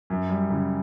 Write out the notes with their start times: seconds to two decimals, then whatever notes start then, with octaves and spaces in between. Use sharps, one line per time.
0.10 F#2
0.30 G3
0.50 C#3